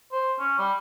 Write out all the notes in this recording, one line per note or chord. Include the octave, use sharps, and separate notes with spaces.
C5
C#4
G3